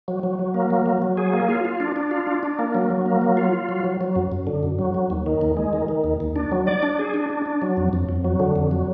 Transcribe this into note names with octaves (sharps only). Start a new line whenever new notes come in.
F#3
F#3
F#3
A#3
F#3
F#3
F#3
G#4
A#3
F4
F4
D4
D4
F4
D4
D4
A#3
F#3
F#3
A#3
F#3
F4
F4
F#3
F#3
F#3
F#2
F#2
D3
F#2
F#3
F#3
D#2
D#3
D#2
G#3
D#3
D#3
D#2
D#2
D4
F#3
D5
D4
G#4
D4
D4
D4
F#3
F2
F2
F2
F#3
D3
F2
F#3